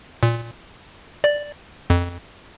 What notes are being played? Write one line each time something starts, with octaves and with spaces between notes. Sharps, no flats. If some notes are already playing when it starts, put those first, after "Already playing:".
A#2
D5
F2